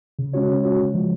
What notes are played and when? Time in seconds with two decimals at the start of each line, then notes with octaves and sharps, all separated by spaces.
0.19 C#3
0.33 G#3 C#4 F#4 C#5
0.48 C#3
0.63 G#3 C#4 F#4 C#5
0.79 C#3
0.94 F3 G#3